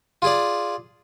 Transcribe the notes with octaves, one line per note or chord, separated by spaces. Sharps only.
F4 G#4 D5